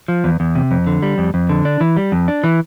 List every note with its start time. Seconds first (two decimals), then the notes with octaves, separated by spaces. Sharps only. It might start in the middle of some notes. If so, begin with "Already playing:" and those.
0.08 F3
0.24 E2
0.40 E2
0.55 C3
0.71 F2
0.87 D3
1.02 G3
1.18 F2
1.34 F2
1.49 D3
1.65 D4
1.81 E3
1.97 G3
2.12 F2
2.28 D4
2.44 E3